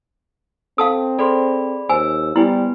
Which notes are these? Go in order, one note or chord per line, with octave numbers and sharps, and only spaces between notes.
C4 A4 F5 A5 D#6
G#4 A4 C5 D5 B5 C6
D#2 C5 G#5 E6
G3 B3 E4 B4 G#5